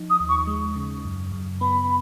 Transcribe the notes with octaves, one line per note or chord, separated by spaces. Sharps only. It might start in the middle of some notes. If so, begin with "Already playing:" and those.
Already playing: F3 D#4
D#6
D#2
C#6
G#3
C#3
F#2
F#2
B3 B5